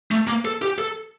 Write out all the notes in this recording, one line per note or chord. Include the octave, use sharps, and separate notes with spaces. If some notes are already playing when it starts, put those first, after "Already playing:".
A3
A#3
A4
G4
A4